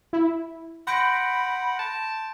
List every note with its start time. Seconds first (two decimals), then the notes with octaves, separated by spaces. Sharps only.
0.13 E4
0.87 F#5 B5 C6 G6 A#6 D7
1.79 A5